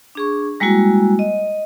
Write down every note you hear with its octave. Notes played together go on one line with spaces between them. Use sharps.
D4 G#4 C#6
G3 G#3 A#3 E4 F#4
D#5